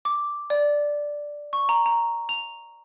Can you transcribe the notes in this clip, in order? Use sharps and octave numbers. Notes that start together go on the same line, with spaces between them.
D6
D5
C#6
A#5
A#5
F7